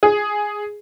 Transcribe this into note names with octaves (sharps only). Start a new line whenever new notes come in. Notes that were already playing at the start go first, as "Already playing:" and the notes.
G#4